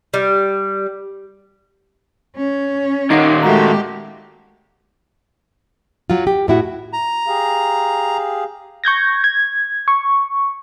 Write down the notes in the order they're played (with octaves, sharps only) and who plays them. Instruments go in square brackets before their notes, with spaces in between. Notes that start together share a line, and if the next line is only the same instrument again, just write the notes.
[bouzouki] G3
[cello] C#4
[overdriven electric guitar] D#2 A#2 [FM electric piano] D#4 F#5 C7
[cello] G#3 G4 [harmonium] A3 F#4 [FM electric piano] A#5
[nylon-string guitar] F#3 F4
G4
A2 E4 F#4
[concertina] A#5
[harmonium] G4 G#4 F5
[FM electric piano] C#6 G6 G#6 A#6
G#6
C#6